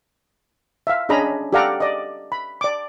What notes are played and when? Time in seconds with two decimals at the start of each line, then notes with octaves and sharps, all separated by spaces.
0.87 E5 F5
1.09 C#4 D4 G#4 D#5 A#5 B5
1.53 G4 A4 D5 F5 F#5 A#5
1.80 D5 D#5
2.32 B5
2.61 D5 D6